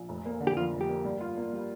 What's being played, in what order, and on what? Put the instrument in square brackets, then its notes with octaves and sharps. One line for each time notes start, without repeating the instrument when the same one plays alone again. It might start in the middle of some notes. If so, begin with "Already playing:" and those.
Already playing: [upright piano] A#1
F1
A#3
D3
[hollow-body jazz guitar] G4
[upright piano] F2 [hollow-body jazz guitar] F4
[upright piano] F1
[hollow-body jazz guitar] G4
[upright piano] A#3
G2
F4
A#3
G3